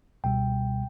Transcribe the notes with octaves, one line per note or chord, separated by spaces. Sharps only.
C#2 B2 G3 G5